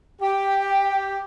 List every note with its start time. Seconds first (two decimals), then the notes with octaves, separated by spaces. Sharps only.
0.22 G4 G5